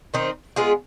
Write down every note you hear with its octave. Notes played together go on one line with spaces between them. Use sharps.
D#3 C4 D#4
G#3 B3 F4 G#4